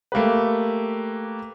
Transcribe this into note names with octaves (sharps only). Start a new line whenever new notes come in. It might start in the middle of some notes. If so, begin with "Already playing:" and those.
A3 A#3 G4 B4